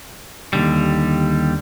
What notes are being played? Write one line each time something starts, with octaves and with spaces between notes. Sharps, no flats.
D#2 D3 G3